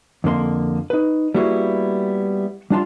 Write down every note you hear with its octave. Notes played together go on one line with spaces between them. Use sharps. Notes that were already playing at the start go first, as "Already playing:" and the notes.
F2 D3 A#3 C6
D#4 B4
G3 A#3 B3 E4 F#4 G#4
G3 D4 F4 A5 C6